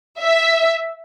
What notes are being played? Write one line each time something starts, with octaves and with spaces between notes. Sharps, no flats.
E5